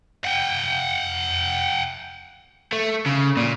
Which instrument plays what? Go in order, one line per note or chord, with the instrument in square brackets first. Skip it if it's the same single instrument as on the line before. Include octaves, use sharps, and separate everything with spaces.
[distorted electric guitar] F#5 G5
[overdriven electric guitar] A3
C#3
A#2